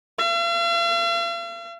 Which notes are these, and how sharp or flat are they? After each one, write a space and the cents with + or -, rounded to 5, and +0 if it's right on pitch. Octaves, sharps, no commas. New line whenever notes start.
F5 -45